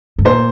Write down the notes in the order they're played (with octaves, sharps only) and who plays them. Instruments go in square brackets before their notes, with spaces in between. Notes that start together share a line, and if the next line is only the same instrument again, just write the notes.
[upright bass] G2
[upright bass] A#2 [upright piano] C5